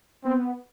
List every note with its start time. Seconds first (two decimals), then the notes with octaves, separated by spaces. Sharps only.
0.25 B3 C4